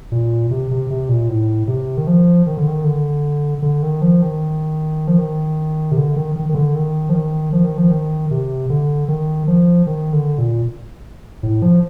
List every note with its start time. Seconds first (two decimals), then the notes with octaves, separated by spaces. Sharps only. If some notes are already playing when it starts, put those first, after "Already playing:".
0.12 A#2
0.51 C3
0.71 C3
0.90 C3
1.09 A#2
1.29 A2
1.67 C3
1.97 D#3
2.07 F3
2.47 D#3
2.57 D3
2.68 D#3
2.84 D3
3.62 D3
3.83 D#3
4.02 F3
4.22 D#3
5.08 F3
5.19 D#3
5.92 C3
5.97 D3
6.16 D#3
6.36 D#3
6.49 D#3
6.55 D3
6.75 D#3
7.09 F3
7.14 D#3
7.53 F3
7.65 D#3
7.78 F3
7.91 D#3
8.31 C3
8.70 D3
9.08 D#3
9.47 F3
9.87 D#3
10.13 D3
10.38 A#2
11.43 A2
11.62 F3